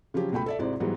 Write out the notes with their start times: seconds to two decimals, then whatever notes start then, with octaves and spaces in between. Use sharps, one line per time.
0.14 C#3 F3 F#3 G4
0.32 C#2 B2 A3 G5 B5
0.46 A4 D5 E5
0.59 G#1 G#2 C3 E4 D5
0.80 G#2 E3 F#3 G3 B3